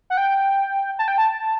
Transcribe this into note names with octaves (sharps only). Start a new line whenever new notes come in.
F#5
G5
A5
G5
A5